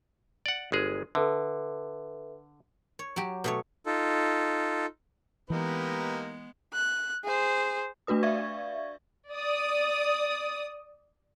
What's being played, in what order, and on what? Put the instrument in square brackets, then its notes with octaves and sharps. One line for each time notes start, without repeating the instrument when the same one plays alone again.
[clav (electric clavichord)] D5 F#5
G1 G#3 G#4
[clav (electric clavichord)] D3 [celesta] A4 B4 E5
[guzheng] C#5
F#3 G4
B2 A3 C#5
[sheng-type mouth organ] D#4 F4 A4
[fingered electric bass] E3 [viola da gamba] G#3 B3 [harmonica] A#3 D#4 G4 [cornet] B4
[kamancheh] F#6
G#4 C5
[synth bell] A3 D4 F#4 B4 D#6
D5 E5 F5 C#6 G#6
[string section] D5 D#6